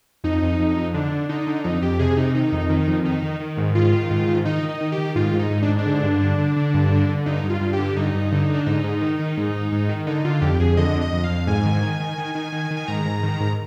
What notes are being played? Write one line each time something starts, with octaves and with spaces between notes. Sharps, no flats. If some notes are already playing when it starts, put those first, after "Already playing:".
F2 D#4
F2
F2
F2
D3 D4
D3
D3 D#4
D3
F2 D#4
F2 G4
C3 G#4
C3 D#4
D#3 D#4
F2
D#3
F2
D#3 D#4
D#3
D#3
G#2
D#3 F4
D#3
G#2
D#3
D#3 D#4
D#3
D#4
D#3
G4
D#3
G#2 F4
G#2
D#4
G#2
D4
G#2
D4
D3
G2
D3
D3
D3
G2
D3
D3
G2 D#4
G2
F4
G2
G4
D3
G2 D#4
G2
D3
D3
D4
G#2 D#4
G#2
D#3
D#3
G#2
G#2
G#2
D#3
D3 D#4
D3 F4
F2 G4
F2 G#4
D3 D#5
F2
D#5
F2
F5
F2
G#2 G#5
D#3
D#3
D#3
D#3
D#3
D#3
D#3
G#5
G#2 A#5
G#2
D#3
G#2